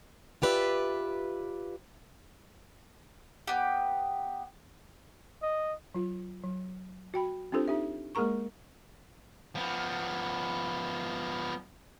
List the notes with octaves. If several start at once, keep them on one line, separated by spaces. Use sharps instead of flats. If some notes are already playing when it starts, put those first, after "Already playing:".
F4 G4 B4 D5 E5
B3 G4
D#5
F#3 F4
F#3
F#4 G5 B5
C4 D4 F4 G4 A4 C5
D#4 G4 E5
G#3 A#3 G#4 A#4 A#5 C#6
F3 B3